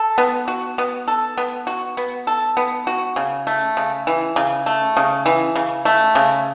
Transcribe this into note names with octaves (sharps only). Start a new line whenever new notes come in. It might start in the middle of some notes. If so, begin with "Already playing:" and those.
Already playing: A4
B3
F#4
B3
A4
B3
F#4
B3
A4
B3
F#4
C#3
A3
C#3
E3
C#3
A3
C#3
E3
C#3
A3
C#3